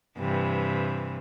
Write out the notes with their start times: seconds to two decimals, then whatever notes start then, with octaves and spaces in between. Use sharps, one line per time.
0.19 G2 C3 E3